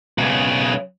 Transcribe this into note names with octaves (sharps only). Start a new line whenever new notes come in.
B1 C#3